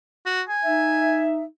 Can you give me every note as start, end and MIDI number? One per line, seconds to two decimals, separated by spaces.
0.26 0.42 66
0.49 1.23 80
0.64 1.44 63
0.64 1.44 76